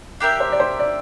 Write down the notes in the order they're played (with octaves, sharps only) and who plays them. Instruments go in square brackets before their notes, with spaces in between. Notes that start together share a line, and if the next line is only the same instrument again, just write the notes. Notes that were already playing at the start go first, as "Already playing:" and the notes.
[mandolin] D4 G4 A#4 E5
[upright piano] C5
D5
C5
D5